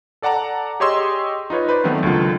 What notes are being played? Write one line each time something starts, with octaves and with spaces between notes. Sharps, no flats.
A4 D5 F#5 A5 A#5
G4 G#4 C#5 D#5 C6 E6
D#4 F4 B4 C#5
B4 C5 D5
D#3 F#3 A3 B3 C4
C#2 D3 D#3 F#3 F4